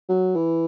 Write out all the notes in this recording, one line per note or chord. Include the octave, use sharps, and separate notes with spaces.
F#3
E3